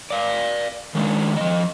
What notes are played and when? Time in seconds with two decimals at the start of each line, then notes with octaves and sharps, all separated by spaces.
0.10 D5 F5
0.95 D#3 G#3 C#4 D4
1.37 F3 D#5